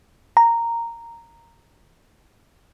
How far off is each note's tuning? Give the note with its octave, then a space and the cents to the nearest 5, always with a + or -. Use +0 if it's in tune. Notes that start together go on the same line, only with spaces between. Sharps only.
A#5 -10